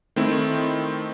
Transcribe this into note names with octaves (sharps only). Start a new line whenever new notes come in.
D#3 A3 C4 E4